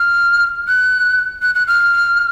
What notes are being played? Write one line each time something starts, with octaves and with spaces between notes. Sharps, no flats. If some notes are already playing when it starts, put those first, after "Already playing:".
Already playing: F6
F#6
F#6
F#6
F6